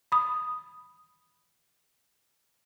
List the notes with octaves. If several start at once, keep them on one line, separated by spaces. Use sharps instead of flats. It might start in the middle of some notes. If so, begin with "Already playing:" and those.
B5 D#6